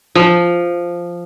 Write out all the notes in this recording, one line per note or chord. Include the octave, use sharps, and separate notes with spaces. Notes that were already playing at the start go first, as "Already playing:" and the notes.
F3